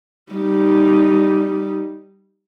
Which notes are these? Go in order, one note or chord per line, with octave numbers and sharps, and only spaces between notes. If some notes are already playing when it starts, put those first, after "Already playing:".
G3 D#4